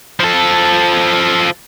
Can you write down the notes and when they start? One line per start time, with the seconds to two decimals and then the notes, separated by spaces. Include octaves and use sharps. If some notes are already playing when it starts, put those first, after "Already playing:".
0.20 F3 A4